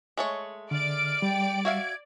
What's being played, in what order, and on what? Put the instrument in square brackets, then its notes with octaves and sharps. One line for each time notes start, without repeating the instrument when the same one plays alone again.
[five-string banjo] G#3 A3 C#5
[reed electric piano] D3 [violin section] D5 D7 [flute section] F6
[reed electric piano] G3 [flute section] G5
[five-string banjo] F#4 E5 F5 [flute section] G#6